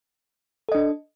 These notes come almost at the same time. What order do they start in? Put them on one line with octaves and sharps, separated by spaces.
A4 D#5 D4